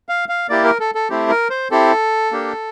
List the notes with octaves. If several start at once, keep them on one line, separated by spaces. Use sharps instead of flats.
F5
F5
A#3 E4 G4 D5
A#4
A4
A4
A3 C4 E4 G4
A#4
C5
C4 E4 G4 A4
A#3 D4 G4